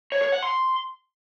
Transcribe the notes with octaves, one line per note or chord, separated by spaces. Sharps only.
C#5
C#5
F#5
C6